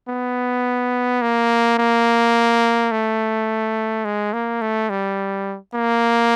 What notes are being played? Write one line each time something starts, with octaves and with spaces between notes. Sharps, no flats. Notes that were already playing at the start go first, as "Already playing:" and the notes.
B3
A#3
A#3
A3
G#3
A#3
A3
G3
A#3